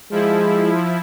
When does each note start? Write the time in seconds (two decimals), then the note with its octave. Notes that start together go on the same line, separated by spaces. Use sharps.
0.11 F3 G#3 E4